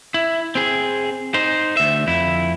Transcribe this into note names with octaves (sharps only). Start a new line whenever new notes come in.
E4
C4 G#4
D#4 C5
D2 E5
F2 E4